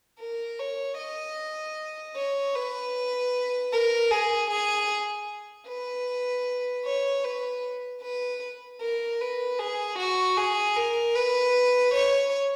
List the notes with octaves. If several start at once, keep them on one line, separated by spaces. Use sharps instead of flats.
A#4
C#5
D#5
C#5
B4
A#4
G#4
G#4
B4
C#5
B4
B4
A#4
B4
G#4
F#4
G#4
A#4
B4
C#5